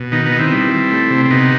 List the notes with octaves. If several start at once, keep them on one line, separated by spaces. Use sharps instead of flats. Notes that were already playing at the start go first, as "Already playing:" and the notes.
Already playing: B2
D#3 B3 D#4
B3 D#4
D#3
C4 E4
G3
G3
A3
C3
C4
C3 B3 D#4